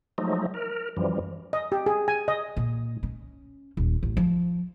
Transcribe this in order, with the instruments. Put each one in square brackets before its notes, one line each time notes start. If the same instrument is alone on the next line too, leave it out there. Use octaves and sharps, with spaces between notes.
[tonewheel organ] F3 F#3 G#3 A3 D#4
A#4
F#2 E3 F3 G3
[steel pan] D#5
G4
G#4
G#5
D#5
[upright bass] A#2
C#4
D#1
A1
F3